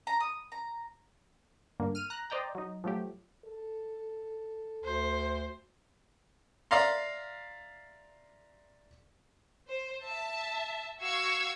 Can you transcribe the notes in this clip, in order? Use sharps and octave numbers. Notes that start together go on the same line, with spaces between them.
A#5
D#6
A#5
G2 D3 A#3
F6 D#7
A#5 F#6
C5 D5 D#5 G5 A#5
F#3 D#4
F3 F#3 A3 G4
A4
D2 C5
D5 E5 F5 A#5 C6
C5
E5 A5
F#4 F5 C#6 E6 G#6